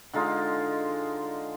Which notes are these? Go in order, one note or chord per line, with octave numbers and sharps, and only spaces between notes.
D3 G#3 D#4 F4